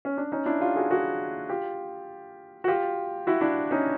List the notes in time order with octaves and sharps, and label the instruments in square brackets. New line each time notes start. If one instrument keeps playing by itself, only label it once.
[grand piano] C#4
D4
C#4 D#4
D4 E4
F4 G4
F#4 G#4
F#4 G#4
F4 G4
F#4
F4 G4
E4 F#4
D4 E4
C#4 D#4